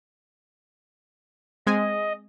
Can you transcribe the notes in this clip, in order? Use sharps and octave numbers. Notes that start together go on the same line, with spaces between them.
G#3 C4 D#5 G#5